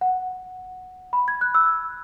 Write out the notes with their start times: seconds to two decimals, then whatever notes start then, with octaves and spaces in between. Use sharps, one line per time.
0.01 F#5
1.13 B5
1.28 G#6
1.41 F#6
1.54 E6